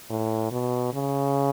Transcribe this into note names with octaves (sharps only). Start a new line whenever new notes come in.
A2
B2
C#3